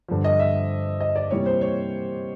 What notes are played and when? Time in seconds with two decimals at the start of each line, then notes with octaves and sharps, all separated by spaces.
0.08 G2 D3 F3
0.24 D#5
0.39 E5
1.01 D#5
1.16 D5
1.31 C3 E3 G3 A#3 C#5
1.46 C5
1.61 C#5